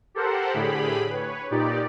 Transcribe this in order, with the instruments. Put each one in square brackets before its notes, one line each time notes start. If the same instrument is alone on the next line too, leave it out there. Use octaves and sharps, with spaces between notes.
[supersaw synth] G4 A4 A#4 C5 F#5
A2 D3 G4 G#4 B5
B4 C#5
A#2 D#4 G4 D5